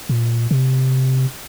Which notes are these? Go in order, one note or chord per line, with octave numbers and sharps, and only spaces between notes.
A#2
C3